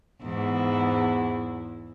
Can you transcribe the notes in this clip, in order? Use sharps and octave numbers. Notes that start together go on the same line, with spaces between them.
E2 G#2 E4